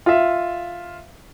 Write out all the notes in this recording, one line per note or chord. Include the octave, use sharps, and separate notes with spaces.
F4 E5